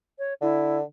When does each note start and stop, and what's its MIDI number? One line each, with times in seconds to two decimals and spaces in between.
0.18 0.34 73
0.42 0.82 50
0.42 0.78 64